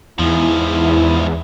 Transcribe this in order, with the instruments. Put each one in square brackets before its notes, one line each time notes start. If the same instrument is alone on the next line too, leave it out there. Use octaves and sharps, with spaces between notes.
[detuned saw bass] E2 [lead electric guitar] G#2 F3 [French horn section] E4